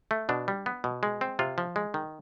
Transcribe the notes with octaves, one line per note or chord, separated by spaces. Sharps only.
A3
B2 D4
G3
B3
B2
G#3
C4
C3 F4
F3
G#3
D#3